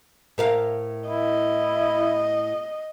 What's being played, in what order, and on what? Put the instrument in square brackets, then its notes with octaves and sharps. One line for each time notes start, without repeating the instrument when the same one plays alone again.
[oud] A2 A#4 F5
[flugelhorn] E4 [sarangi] D#5